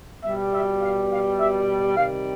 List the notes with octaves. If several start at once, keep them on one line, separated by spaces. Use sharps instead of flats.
B2 G3 E5
E5
F5
F5
E5
C3 D#3 G3 F5